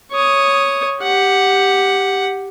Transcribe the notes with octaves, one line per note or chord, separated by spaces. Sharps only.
C#5 D#6
G4 F#5